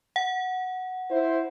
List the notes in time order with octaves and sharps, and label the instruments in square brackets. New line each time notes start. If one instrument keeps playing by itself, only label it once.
[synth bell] F#5
[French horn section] E4 C5